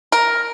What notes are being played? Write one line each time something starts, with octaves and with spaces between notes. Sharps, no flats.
A#4